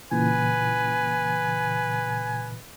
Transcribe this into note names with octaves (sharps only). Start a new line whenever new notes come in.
A#2 C#3 E3 B4 G#5